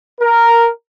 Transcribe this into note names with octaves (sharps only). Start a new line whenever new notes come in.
A#4